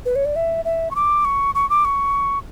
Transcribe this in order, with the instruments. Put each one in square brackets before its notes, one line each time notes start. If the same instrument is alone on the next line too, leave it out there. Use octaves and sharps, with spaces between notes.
[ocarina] B4
C#5
D5
E5
E5
C#6
D6
C#6
C#6
D6
C#6